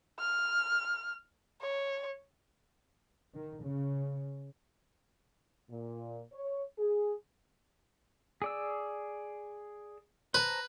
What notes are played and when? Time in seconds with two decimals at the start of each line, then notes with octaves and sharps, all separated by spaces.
0.19 F6
1.61 C#5
3.34 D#3
3.64 C#3
5.70 A#2
6.33 C#5
6.78 G#4
8.42 G#4 D5 E6
10.34 B4 C5 A5 A#5